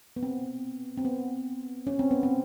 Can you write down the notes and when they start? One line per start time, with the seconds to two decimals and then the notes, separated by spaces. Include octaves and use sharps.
0.16 B3
0.23 C4
0.98 C4
1.05 B3
1.87 C#4
1.99 C4
2.11 B3
2.23 C4